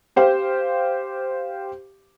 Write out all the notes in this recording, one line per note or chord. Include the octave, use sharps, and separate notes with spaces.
G4 C5 F5 G5